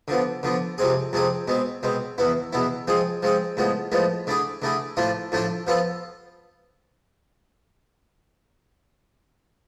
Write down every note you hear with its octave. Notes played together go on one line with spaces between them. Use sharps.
D3 F3 B3
D3 F3 B3
F2 C3 G#3 C4 G#4
F2 C3 G#3 C4 G#4
B2 G#3 C4
B2 G#3 C4
E2 B2 B3 E4
E2 B2 B3 E4
F3 G#3 C4 G#4
F3 G#3 C4 G#4
A2 F3 G#3 B3
A2 F3 G#3 B3
D3 A3 E4 G#4
D3 A3 E4 G#4
A2 F3 A3 D4 F4
A2 F3 A3 D4 F4
F3 B3 F4 A4